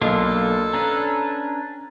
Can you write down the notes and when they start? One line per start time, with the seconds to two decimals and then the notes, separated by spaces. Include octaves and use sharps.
0.02 B1 A#3 D4 F4 A4 D#5
0.74 C#4 D4 B4 A#5